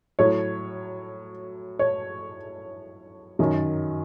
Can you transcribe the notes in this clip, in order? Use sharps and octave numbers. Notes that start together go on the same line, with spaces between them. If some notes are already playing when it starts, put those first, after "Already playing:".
A2 F#3 C#5
C#5
F#2 D#3 F#3